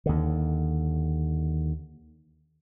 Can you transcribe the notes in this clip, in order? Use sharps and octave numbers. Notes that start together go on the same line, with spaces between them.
D#2 D3